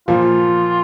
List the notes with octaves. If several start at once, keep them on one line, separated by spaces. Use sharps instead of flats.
A#2 F3 A#3 F4